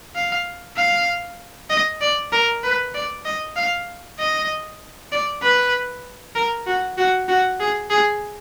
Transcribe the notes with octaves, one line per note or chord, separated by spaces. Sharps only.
F5
F5
D#5
D5
A#4
B4
D5
D#5
F5
D#5
D5
B4
A#4
F#4
F#4
F#4
G#4
G#4